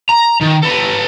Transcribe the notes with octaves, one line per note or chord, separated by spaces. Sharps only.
A#5
D#3
A4 B4